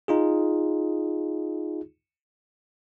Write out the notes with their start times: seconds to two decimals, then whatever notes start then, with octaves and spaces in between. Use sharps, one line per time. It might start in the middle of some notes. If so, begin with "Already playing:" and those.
0.08 D#4 F4 G#4